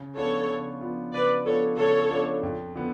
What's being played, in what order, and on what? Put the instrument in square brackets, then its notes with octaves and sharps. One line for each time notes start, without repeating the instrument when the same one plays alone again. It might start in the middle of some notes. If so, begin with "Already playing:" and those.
Already playing: [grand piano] C#3
[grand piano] F3 B3 D4 F4 [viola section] A4 C#5
[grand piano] C#3
F3 B3 D4 F4
[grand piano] C#3 [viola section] B4 D5
[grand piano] F3 B3 D4 F4 [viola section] A4 C#5
[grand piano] C#3 [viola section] A4 C#5
[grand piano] F3 B3 D4 F4
F2
D3 F3 B3